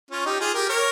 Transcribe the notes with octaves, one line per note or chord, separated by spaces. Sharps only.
C#4 F4
D#4 G4
F4 G#4
G4 A#4
A#4 C#5